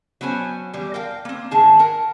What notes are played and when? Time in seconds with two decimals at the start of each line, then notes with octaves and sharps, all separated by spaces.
0.21 F#3 B3 C#4 C5 G#5
0.73 E2 G3
0.94 A#4 F5 G5
1.25 A#3 C4
1.51 G#2 D#3 G#4 A5
1.79 A#4 F#5